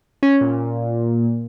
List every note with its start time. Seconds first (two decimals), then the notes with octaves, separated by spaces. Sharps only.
0.23 C#4
0.41 A#2